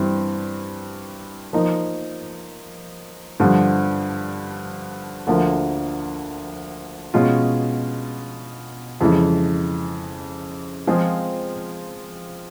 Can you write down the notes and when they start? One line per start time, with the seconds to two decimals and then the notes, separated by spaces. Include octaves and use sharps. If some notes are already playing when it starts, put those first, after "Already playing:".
Already playing: G2 E3 G3 C4
1.53 F3 A#3 D#4
3.40 G2 D3 F3
5.27 D2 D3 F3 A#3
7.14 B2 G#3 C#4 F4
9.01 F2 C#3 E3 G#3
10.87 F3 G#3 C4 F4 G#4